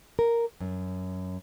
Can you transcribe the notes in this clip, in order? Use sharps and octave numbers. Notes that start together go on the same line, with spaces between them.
A#4
F#2